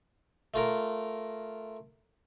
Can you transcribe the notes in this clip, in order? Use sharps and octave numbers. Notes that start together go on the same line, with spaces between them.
A3 F4 A#4